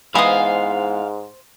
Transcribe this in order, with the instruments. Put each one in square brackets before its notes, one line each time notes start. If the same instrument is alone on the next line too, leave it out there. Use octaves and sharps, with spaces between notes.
[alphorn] G#2 [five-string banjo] E3 G#3 B3 [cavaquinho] C5 D#6 [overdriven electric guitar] F5